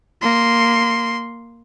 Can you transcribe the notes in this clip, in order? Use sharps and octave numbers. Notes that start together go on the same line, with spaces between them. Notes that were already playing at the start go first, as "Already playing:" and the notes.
A#3 C6